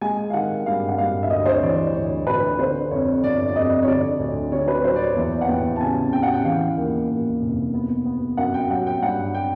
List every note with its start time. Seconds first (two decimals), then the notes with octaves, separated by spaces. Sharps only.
0.01 G#3 G#5
0.30 F5
0.33 D#3 F#5
0.66 G2 F5
0.88 F#5
0.98 G2 F5
1.23 E5
1.30 D2 D#5
1.46 C5
1.54 C#5
1.62 E3 D5
1.94 D2 C#5
2.27 D2 B4
2.59 D3 C5
2.91 F2 C#5
3.23 G1 D5
3.48 D5
3.55 F2 D#5
3.83 C#5
3.88 D3 D5
4.20 D2
4.52 D3 C#5
4.68 B4
4.84 F#3 C5
4.96 D5
5.01 C#5
5.16 E2 D5
5.41 F#5
5.49 E2 G5
5.76 A5
5.81 C#3 G#5
6.13 C#3 G5
6.23 F#5
6.34 G5
6.45 E3 F5
6.77 D#2
7.10 D#2
7.41 F1
7.74 B3
8.06 B3
8.37 F#2 F#5
8.54 G5
8.70 F#3 F#5
8.87 G5
9.02 G2 F#5
9.35 G5